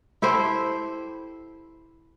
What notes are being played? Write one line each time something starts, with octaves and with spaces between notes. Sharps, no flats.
E4 G4 A4 C5